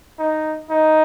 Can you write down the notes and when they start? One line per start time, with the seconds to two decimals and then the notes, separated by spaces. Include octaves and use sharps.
0.19 D#4
0.70 D#4